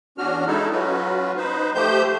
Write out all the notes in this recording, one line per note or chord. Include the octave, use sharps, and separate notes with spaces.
E2 C#4 D4 F#4 F6
G#3 D#4 E4 A4
F#3 C#4 F4 F#4 B4
D#4 B4 C5
F3 A3 G4 C5 G6